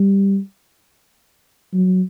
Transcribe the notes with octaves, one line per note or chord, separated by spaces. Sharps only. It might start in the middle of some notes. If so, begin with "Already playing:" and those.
Already playing: G3
F#3